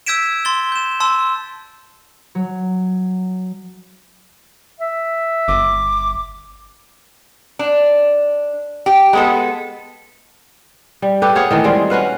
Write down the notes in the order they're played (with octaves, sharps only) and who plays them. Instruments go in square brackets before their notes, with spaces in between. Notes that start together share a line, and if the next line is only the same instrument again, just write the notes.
[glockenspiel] E6 G6 G#6 B6 D7 E7
C6 A6 G7
G6 E7
A5 C6 E6
[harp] F#3
[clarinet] E5
[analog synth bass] G1 [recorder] D6
[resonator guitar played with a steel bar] D4
G4
G#3 B3 A4
[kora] G3
G4 A4 B4
B3 G#4 C#5 F5
D#3 E3 A3
G3 G#3 C4 F4
C#4 F#4 B4 F5